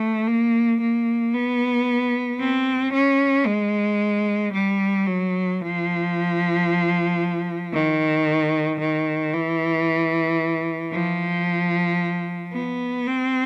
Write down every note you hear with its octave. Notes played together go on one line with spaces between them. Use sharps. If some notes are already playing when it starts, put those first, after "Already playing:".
Already playing: A3
A#3
A#3
B3
C4
C#4
G#3
G3
F#3
F3
D#3
D#3
E3
F3
B3
C4